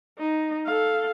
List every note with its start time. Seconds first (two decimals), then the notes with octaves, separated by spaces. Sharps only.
0.19 D#4
0.66 A4 F5